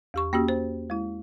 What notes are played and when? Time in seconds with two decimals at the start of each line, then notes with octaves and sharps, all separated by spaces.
0.14 E2 G4 C#6
0.33 A#3 C#4 F#4 G4
0.49 C5
0.90 G#3 E4